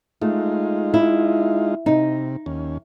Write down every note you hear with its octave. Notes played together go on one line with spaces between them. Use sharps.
G#3 A3 D#4 F4
E4
C3 D#4
D#2 C#4